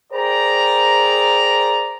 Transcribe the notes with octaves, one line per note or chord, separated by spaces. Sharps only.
G#4 A#4 C5 D5 G5 A#5